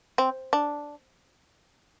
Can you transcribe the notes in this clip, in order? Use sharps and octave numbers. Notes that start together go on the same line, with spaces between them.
C4
D4